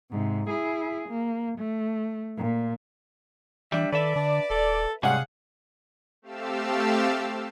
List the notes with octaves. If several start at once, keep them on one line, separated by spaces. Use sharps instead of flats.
G#2 C3
E4 G#4
A#3
A3
A#2
E3 G3 D4 E5
D#3 A4 B4 D5 E5
D3 D4
D#1 A4
G#2 C3 G3 C#4 G#4 F5 F#5
A3 C4 G4 F5 A5 E6